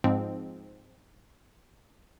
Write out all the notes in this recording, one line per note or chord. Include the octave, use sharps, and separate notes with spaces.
G#2 F3 G#3 C4